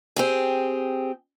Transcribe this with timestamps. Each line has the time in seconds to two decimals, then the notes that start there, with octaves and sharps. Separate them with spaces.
0.16 C4 G4 G#4